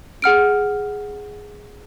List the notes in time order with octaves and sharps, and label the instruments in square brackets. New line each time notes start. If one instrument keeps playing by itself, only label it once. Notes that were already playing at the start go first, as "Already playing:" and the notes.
[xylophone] G#4 F#5 F6 D7